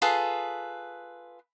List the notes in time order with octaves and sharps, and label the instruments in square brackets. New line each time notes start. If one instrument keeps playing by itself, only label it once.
[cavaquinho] F4 G#4 A4 B4